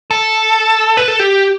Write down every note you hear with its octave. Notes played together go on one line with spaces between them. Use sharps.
A4
B4
A4
G4